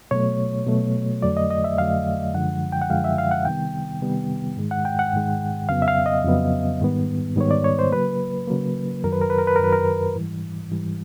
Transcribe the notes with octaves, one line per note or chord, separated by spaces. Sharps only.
B2 F#3 A3 C#5
B2 F#3 A3
F2 D3 F#3 A3 D5
D#5
D#5
E5
F2 D3 F#3 A3 F5
F#2 D3 F3 G#3 F#5
G5
F#5
F#2 D3 F3 G#3 F5
E5
F5
F#5
C3 D#3 G3 B3 G5
C3 D#3 G3 B3
G#2 D#3 G#3
F#5
G5
F#5
G#2 D#3 G#3
F2 C#3 F#3 B3 F5
E5
F5
D#5
F2 C#3 F#3 B3
G#2 D#3 G3 B3
G#2 D#3 G3 B3 C#5
D5
C#5
C5
C#3 F#3 A#3 B4
C#3 F#3 A#3
F#2 D#3 F#3 A#4
B4
A#4
B4
A#4
B4
A#4
F#2 D#3 F#3 B4
A#4
G#2 E3 G3
G#2 E3 G3